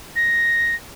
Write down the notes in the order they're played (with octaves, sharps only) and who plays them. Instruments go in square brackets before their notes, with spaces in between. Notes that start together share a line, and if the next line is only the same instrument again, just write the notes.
[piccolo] A#6